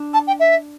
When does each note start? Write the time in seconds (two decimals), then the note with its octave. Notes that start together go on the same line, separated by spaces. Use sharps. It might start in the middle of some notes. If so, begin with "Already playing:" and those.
Already playing: D4
0.13 A5
0.27 G5
0.39 E5